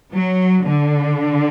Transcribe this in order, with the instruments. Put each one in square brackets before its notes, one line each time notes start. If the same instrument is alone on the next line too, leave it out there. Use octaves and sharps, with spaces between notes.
[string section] F#3
D3